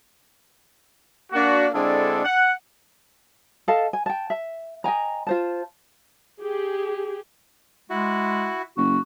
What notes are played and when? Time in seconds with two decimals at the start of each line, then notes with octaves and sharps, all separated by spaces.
1.32 A#3 D4 F#4
1.73 D3 G#3 C4 D4 E4 A4
2.24 F#5
3.68 A4 D#5 F5 A5
3.93 G#5
4.06 G5 A5
4.30 E5
4.84 D#5 G5 G#5 A#5
5.27 F4 C5 A5
6.41 G4 G#4
7.90 G#3 E4 F#4
8.77 F#1 F#4